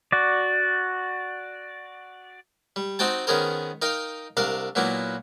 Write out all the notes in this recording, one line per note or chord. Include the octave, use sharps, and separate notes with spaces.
F#4 D5
G3
C4 D#4 F#4 C5 G5 A5
D#3 B3 C#4 G#4 A#4 C5
D#4 A#4 F5 G5
C2 D4 A#4 F5
A#2 F#3 A#3 B3 E4